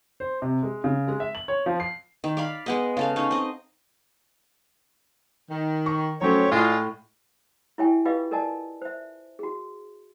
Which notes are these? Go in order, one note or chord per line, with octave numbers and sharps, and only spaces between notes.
C5
C3
G#3
C#3
G#3
E5
F#7
C#5
F3
C7
D#3
D5 F5 B5
G#3 B3 D#5
C#3 A4 F5
C#4 D#4
C4 D#5
D#3
C#6
F#3 A3 C#4 G4 C5 C#5
A2 G#3 D4 F4
E4 G4 C#5 E5 G5 G#5
F4 G4 B4 D#5 F5 D6
A4 A#4 D5 D#5 G#5 A5
C5 E5
F#4 G#4